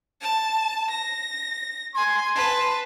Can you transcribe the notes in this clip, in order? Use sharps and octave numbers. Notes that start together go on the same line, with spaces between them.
A5
A#6
G#5 C6
B4 A5